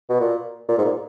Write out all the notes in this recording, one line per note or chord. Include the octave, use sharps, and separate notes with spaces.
B2
A#2
A#2
G#2
A#2